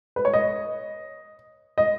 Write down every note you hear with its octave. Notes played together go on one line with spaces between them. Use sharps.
B4
C#5
D#5
D#5